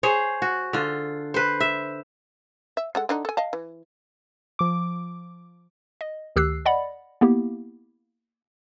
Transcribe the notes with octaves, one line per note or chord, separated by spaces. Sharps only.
G#4 C5 C#5
F#4
D3 F4
B4 C5
E5
E5
G#3 A4 F#5
D3 D4 D#4
A4 G#5
D#5 F5 A5
E3
F3 D6
D#5
D2 D#3 G4 E6 F#6 C7
D5 D#5 F#5 B5
A#3 B3 E4 G4